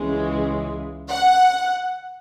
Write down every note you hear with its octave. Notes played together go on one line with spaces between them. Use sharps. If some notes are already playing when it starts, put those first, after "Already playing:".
Already playing: C#2 C#3 E3 G#3
F#5